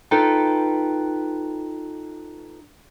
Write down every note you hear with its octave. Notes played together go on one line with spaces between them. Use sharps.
D#4 F4 A4 B4 G5